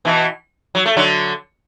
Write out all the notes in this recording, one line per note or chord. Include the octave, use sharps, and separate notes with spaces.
B2 E3
F#3
A3
D3 F#3